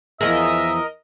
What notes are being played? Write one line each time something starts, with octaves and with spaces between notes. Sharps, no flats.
E2 F3 G#4 A#4 D#5 E5